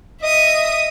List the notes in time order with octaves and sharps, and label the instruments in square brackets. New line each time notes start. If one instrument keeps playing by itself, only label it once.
[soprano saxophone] D#5 [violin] E5 D#6